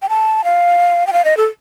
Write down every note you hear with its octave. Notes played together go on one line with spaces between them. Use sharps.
G5
A5
F5
G5
F5
D#5
A4